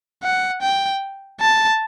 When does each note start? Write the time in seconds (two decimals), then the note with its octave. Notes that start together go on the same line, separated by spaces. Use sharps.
0.24 F#5
0.62 G5
1.41 A5